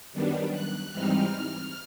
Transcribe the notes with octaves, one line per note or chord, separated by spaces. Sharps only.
F#2 D#3 G3 B3 D4
F#6
G#2 E3 G3 C4 D#4 F6